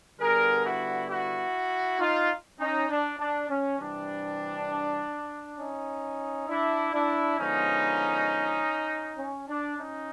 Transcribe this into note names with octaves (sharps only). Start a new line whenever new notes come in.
D3 G3 B3 G#4 A#4
E4 F#4
E4 F#4
D#4 F4
C#4 D#4
D4
D4
C#4
C3 E3 G3 D4
C#4 D#4
D4 E4
D4 E4
D3 F3 G#3 B3 C#4 D#4
C#4
D4
C#4 D#4